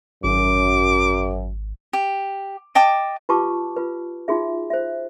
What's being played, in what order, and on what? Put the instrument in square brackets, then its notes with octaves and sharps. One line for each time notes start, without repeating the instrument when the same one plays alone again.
[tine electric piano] G#1 [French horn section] F#2 [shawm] D6
[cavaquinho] G4
D#5 G5 A5 D6
[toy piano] F4 G4 B4 A5 C#6 D6
F4 B4
D#4 F4 F#4 G#4 E5
C5 E5